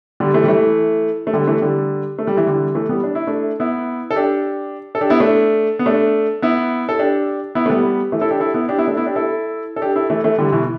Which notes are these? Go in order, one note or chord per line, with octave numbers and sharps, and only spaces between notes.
D3 G3
E3 A3
G3
E3 A3
A3
D3 G3
E3 A3
D3 G3
A3
G3
E3
D3 G3
E3 A3
G3 B3
D4
E4
A3 D4
B3 E4
A4
D4 G4
A4
D4 G4
B3 E4
A3 D4
B3
A3 D4
B3 E4
A4
D4 G4
B3 E4
A3
G3 B3
E3 A3
E4 A4
D4 G4
E4 A4
B3 E4
D4 G4
B3 E4
A3 D4
B3 E4
D4 G4
E4 A4
A4
D4 G4
E4 A4
E3 A3
E3 A3
D3 G3
B2 E3